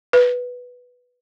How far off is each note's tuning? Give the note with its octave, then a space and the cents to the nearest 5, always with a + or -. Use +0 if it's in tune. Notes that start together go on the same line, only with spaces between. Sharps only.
B4 -5